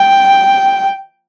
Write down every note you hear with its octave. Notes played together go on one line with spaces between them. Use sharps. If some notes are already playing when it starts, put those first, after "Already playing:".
Already playing: G5